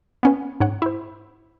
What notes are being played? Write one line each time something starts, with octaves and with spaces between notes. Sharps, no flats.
B3 C#4 B4
G#2 C#5 F#5
E4 C5